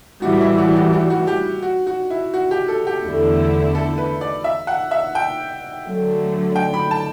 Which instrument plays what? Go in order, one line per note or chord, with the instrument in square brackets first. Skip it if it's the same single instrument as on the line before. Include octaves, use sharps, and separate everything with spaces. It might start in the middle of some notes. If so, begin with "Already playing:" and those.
[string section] A2 E3 G3 [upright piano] F#4
[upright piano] E4
F#4
F#4
F#4
F#4
G4
F#4
F#4
E4
F#4
G4
A4
G4
[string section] E2 D3 A3 E4
[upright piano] A4
B4
D5
E5
F#5
E5
G5
[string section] D3 F#3 A3
[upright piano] G5
B5
A5